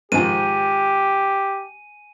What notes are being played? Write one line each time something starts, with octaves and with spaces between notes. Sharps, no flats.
G#2 D#3 F3 G4 G#5 D#7